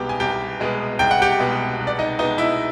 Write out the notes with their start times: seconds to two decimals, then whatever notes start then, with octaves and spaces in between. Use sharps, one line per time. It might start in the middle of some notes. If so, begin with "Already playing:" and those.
Already playing: C2 B2 G#3 B3 G4 G5
0.09 G#5
0.20 C2 G4 G5
0.60 B2 G#3 B3
0.99 C2 G5
1.11 F#5
1.22 G4 G5
1.39 B2 G#3 B3
1.79 C2
1.87 D5
1.99 D#4 D#5
2.19 B2 G#3 B3 D#4 D#5
2.38 E4 E5